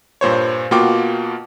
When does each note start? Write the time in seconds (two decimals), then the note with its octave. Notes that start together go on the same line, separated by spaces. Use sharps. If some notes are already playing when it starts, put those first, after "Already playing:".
0.21 G2 A#2 C5 C#5
0.71 B2 A#3 F4 F#4 G5 D6